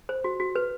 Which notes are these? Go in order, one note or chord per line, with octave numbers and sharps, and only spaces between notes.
C5
F#4
F#4
B4